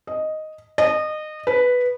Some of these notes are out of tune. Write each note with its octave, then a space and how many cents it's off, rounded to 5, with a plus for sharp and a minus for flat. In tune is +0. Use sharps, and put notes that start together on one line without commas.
D#5 +0
D#5 -25
B4 +0